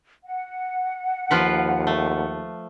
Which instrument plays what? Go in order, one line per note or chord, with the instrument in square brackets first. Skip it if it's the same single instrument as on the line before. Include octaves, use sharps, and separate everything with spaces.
[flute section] F#5
[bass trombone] D#2 [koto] F3 F4 B4
[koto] A3